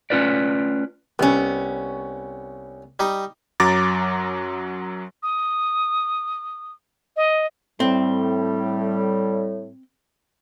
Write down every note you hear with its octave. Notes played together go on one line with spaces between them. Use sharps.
A3 C#4 F4 B4 D5
C2 B3 C#4
G3 D#4 D#5
F#2 F#3 A#5 D6 A6 A#6
D#6
D#5
A2 G3 C4